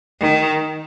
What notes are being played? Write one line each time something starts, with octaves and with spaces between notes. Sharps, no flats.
D#3